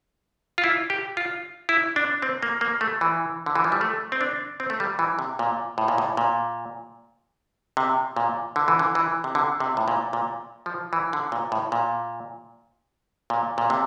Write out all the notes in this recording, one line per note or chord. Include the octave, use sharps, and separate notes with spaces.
F4
E4
G4
F4
E4
D4
C4
A#3
A#3
A3
E3
D3
E3
F3
G3
A3
C4
D4
C4
A3
G3
E3
C3
A#2
A2
A#2
A2
A#2
C3
A#2
D3
E3
D3
E3
C3
D3
C3
A2
A#2
A#2
F3
E3
D3
A#2
A2
A#2
A#2
A#2
C3